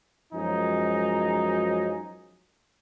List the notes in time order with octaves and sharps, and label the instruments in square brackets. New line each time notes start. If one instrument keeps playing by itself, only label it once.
[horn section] F#2 F3 F#3 G#3 D#4 G#5